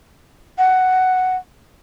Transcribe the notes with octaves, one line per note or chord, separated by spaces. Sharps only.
F#5